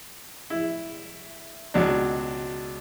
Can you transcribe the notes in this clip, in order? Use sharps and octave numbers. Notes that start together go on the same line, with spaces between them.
E4
C#2 B2 F#3 D4